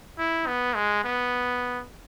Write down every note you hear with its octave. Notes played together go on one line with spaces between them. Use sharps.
E4
B3
G#3
B3